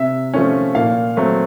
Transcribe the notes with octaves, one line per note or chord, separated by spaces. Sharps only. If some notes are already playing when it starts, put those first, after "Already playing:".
Already playing: C3 E5
F3 A3 C#4
A#2 F5
F#3 A3 C4